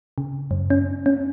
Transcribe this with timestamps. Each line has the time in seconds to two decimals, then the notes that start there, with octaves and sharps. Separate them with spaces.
0.18 C#3
0.51 F#2
0.70 C#4
1.06 C#4